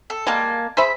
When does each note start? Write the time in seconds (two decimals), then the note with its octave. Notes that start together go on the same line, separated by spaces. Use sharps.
0.10 A4
0.27 G3 G#3 A#3 G#5 A5
0.77 G#4 C5 E5 B5